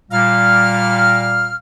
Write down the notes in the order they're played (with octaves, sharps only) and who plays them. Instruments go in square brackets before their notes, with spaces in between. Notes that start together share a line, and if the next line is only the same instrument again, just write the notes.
[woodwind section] A#2 G3 F5 F6